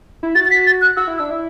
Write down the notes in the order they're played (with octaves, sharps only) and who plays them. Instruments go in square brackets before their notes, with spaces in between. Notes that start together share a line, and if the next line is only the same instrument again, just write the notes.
[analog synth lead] E4
[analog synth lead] F#4 [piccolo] A6
[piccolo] A6
B6
A6
F#6
[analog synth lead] F#4 [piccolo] E6
[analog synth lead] E4
[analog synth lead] D4 [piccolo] E6
[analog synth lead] E4